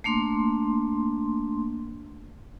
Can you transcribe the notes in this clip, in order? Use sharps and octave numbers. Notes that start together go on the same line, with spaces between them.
A3 A#3 D4 C6